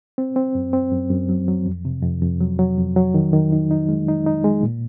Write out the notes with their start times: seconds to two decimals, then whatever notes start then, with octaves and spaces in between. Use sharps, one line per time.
0.18 C4
0.36 C4
0.55 F#2
0.73 C4
0.92 F#2
1.10 F#2
1.29 F#3
1.48 F#3
1.66 F2
1.85 C3
2.03 F2
2.22 F2
2.41 F#3
2.59 F#3
2.78 F2
2.96 F#3
3.14 D#3
3.33 D#3
3.52 D#4
3.71 D#4
3.89 G#3
4.08 D#4
4.26 D#4
4.44 G#3
4.63 A#2